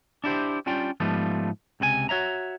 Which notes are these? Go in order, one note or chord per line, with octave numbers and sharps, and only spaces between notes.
D4 E4 G4 C5
G3 C#4 D4 F4 G5
G#2 F3 G3 A3 B3 F4
C#2 C3 B4 G#5
F#4 C#5 E5 A#5